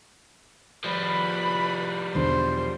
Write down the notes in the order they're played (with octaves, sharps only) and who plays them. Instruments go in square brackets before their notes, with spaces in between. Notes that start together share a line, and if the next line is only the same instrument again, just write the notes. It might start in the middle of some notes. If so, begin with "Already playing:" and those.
[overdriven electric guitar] F3 G3 [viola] B4 B5
[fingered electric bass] B1 E2 D3 [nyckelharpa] C5